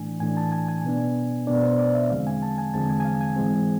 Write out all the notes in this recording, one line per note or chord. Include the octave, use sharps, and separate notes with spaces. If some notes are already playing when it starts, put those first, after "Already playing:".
Already playing: A2 E3 A3 D4 G#5
A2 E3 A3 D4 G#5
A5
G#5
G#5
B2 B3 D4
B2 B3 D4 D5
C5
D5
E5
E2 D3 F3 G#3 C4 F5
G#5
A5
G#5
E2 D3 F3 G#3 C4 A5
G#5
G#5
F5
G#5
G#2 E3 G#3 C4